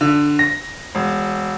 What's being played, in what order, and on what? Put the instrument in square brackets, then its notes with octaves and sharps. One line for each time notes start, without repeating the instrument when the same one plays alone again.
[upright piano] D3
A#6
E1